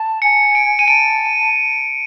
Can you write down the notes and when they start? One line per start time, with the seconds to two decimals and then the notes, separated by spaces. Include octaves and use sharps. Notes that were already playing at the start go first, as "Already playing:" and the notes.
Already playing: A5
0.22 G#5 C#7
0.55 D7
0.79 D#7
0.88 A5 D7